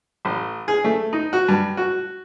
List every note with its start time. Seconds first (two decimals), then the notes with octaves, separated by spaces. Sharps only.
0.25 A1
0.68 G#4
0.84 A3
1.13 D#4
1.33 F#4
1.48 G2
1.77 F#4